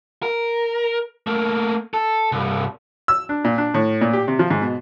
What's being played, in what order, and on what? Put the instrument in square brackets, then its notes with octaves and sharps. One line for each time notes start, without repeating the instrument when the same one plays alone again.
[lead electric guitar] A#4
A3 A#3
A4
C2 G2
[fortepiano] E6
D4
A#2
D4
A2
A#2
G4
C3
F3
G#2
B2